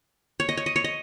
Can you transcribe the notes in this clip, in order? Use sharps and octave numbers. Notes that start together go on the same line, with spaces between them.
C#5
D#5
C#5
D#5
C#5
D#5